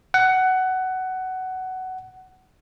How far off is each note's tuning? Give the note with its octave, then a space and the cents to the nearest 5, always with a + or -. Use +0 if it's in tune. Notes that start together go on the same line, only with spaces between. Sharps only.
F#5 +15